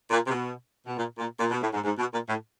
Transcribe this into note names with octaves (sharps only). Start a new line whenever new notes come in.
A#2
C3
B2
B2
A#2
A#2
A#2
B2
A2
G#2
G#2
B2
A#2
A2